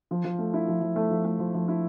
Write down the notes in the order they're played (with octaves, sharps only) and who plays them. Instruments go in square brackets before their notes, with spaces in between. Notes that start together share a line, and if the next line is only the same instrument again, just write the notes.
[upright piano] F3
F3
A3
E4
F3
F3
A3
F3
A3
F3
F3
E4